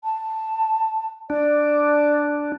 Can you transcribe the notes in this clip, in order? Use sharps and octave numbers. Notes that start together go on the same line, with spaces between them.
A5
D4 D5